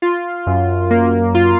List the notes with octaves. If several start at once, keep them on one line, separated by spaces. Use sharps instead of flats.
F4
F#2
A#3
F4